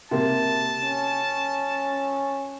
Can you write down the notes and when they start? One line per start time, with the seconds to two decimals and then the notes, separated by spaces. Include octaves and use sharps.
0.11 C3 A#3 A5
0.83 C#4